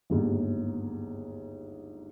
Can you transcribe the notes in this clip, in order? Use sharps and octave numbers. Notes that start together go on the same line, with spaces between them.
G1 D#2 G#2